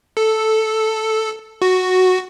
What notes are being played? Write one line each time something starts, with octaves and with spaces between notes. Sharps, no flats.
A4
F#4